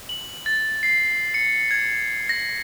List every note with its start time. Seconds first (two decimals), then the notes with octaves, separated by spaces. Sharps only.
0.09 F#7
0.46 A6
0.83 C7
1.34 C#7
1.71 G#6
2.29 A#6